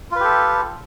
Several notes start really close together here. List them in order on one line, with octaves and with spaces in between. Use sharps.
F4 B4 G4 A4